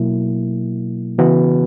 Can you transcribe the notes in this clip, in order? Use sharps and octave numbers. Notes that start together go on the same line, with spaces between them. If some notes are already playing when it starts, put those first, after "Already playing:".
Already playing: B2 F#3 A#3 E4
C#3 E3 B3 F#4 B4